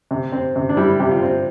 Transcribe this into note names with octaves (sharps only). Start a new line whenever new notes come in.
C3
C4
C3
D4
G3 E4
C3 G4
F4
C4